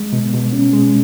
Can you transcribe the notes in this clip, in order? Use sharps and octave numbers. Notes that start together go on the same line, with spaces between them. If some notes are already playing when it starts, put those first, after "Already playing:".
Already playing: G#3
B2
B2
C#4
G#3